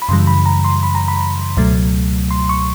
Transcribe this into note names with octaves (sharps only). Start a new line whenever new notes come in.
B5
F#2 C#3 E3 G3 C6
B5
A#5
C6
B5
A#5
B5
C#2 B2 F#3 A3
C6
C#6